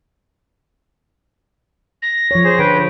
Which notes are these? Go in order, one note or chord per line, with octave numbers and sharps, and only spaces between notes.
A#6
F3 C#5
G#4 C5
D3 B4 G5